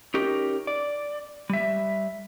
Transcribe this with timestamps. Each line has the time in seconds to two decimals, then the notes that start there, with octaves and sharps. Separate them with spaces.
0.14 C#4 D#4 G4 A#4
0.67 D5
1.50 G3 E5